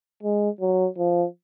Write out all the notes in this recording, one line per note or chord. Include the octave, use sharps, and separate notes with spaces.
G#3
F#3
F3